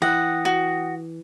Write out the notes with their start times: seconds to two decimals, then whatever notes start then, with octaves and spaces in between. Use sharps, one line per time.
0.02 E3 F#5 G5 D#6 A#6
0.45 F#4